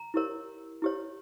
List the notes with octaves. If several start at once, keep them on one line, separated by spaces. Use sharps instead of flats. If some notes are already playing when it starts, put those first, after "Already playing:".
Already playing: A#5
E4 G4 A#4 C#5
E4 G4 C#5